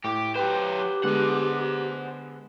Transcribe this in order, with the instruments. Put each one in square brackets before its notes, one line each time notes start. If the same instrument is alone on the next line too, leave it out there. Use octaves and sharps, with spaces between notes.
[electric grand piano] A2 D6 [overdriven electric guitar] G4
[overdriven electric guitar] F#3 C5 [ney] G4 [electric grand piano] B4 G5
[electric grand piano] D3 G#3 B3 [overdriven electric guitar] C5 F#5